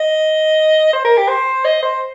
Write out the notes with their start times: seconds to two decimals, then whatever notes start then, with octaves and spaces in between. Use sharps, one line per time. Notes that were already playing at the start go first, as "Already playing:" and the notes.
Already playing: D#5
0.93 C5
1.05 A#4
1.18 G4
1.28 C5
1.65 D#5
1.83 C5